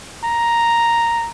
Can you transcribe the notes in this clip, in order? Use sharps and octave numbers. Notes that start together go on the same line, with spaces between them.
A#5